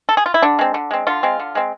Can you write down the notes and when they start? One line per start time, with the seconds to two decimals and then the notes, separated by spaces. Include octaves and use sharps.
0.09 A4
0.17 G#4
0.26 F4
0.34 E4
0.42 D3 D4
0.59 G#3 C4
0.74 D3
0.91 G#3 C4
1.07 D3 F4
1.23 G#3 C4
1.39 D3
1.55 G#3 C4